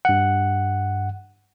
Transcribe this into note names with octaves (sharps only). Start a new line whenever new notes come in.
G2 F#5